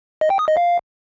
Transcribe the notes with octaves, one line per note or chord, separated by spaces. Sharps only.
D#5
G5
D#6
D#5
F5